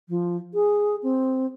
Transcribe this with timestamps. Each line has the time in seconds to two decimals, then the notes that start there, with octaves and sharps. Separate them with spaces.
0.08 F3
0.53 G#4
1.02 C4